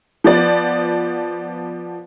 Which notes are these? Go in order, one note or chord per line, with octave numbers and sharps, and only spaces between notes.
F3 B3 D5